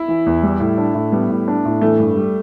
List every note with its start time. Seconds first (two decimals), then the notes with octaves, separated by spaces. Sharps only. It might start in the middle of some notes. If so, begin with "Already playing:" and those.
Already playing: E4
0.08 E3
0.26 E2
0.43 G3
0.60 A2
0.78 D4
0.95 A2
1.12 G3 B3
1.30 A2
1.48 D4
1.65 A2
1.81 E3 A3
1.99 G2
2.16 G3